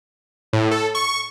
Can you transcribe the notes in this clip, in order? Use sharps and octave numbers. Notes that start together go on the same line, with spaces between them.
A2
A4
C#6